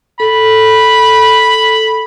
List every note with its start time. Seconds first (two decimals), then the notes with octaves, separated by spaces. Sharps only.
0.20 A4 B5